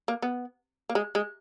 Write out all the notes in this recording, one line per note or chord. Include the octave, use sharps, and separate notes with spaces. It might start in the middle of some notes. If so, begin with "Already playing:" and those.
A#3
B3
A#3
G#3
G#3